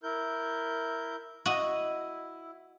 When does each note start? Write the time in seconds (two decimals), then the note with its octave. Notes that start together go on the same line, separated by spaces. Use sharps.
0.03 E4 A#4 G6
1.46 E4 F#4 D#5